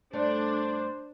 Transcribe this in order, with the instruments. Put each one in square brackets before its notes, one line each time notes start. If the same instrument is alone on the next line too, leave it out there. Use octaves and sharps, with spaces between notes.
[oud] G2 A3 D5 [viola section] D4 [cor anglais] C5